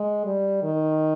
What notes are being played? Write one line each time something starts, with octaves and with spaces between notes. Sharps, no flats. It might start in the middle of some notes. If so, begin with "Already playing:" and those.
Already playing: G#3
G3
D#3